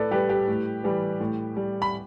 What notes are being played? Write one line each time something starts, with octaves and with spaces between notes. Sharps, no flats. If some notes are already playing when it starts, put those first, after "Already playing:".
Already playing: A2 A4 B4 D5
G3 G4 B4
G4 B4
A2
E3 G3
A2
G3
B5